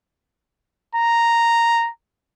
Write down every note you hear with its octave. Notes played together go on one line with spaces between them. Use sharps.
A#5